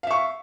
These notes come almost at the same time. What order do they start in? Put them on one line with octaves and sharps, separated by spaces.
F5 E5 C#6